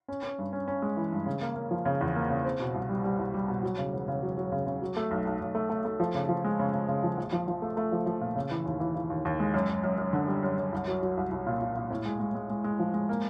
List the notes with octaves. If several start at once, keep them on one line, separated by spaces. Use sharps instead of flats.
C#4
C#4
G2
C#4
C#4
G#3
E3
G2
C#3
A#3
A#3
F3
C#3
E2
A#3
C#3
C4
B2
C2
G3
G3
C2
G3
B2
F#3
C#3
E1
C#3
F#3
F#3
C#3
C#3
F#3
A3
B1
B1
B1
A3
A3
A3
F3
C#3
F3
G#3
C#3
C#3
C#3
F3
A#1
F3
F3
A3
A3
F3
F3
A#2
C#3
E3
D#2
E3
E3
D#2
D#2
G#3
F#2
F#2
F#2
F#2
D3
G3
F#2
F#2
C2
F#3
F#3
C2
C2
A#2
A#2
A#2
A2
G#3
G#3
G#3
G#3
G#3
F3
G#3
A#3